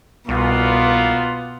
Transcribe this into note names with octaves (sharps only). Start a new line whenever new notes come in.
C2 B2 A#3 B3 F4